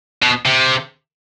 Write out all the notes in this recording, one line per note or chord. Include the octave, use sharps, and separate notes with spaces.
B2
C3